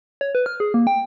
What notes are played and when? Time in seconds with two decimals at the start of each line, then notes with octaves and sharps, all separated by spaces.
0.21 C#5
0.35 B4
0.46 F6
0.60 G#4
0.74 A#3
0.87 G5